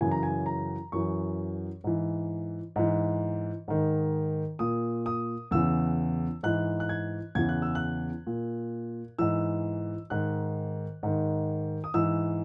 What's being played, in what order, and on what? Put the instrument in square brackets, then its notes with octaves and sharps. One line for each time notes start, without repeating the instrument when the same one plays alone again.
[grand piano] F#2 C#3 E3 G#5
A#5
G#5
A#5
F#2 E3 C#6
G#2 E3
G#2 E3
G#2 D#3
A#2 D#6
D#6
E2 C#3 E3 E6
G#2 E3 F#6
F#6
G#6
E2 C#3 E3 G#6
F#6
E6
F#6
A#2
G#2 E3 E6
G#2 D#3 F#6
G#2 D#3
D#6
G#2 E3 E6